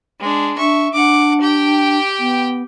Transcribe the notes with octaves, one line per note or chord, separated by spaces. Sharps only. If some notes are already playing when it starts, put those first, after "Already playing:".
G#3 D4
D4 E5 C#6
D4 F#5 D6
G4 G5
B3